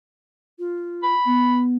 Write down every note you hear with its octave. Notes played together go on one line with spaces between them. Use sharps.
F4
B5
B3